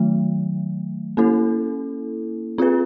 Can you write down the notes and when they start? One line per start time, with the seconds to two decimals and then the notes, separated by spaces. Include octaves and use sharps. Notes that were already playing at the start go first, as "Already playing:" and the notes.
Already playing: D#3 F#3 A3
1.17 A#3 C#4 E4 A4
2.58 C4 F4 G#4 B4